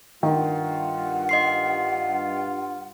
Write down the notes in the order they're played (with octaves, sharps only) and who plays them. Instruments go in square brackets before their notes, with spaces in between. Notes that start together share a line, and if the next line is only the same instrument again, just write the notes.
[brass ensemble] G2 F4 [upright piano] D#3 [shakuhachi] F#5
[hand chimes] D#5 C6 C7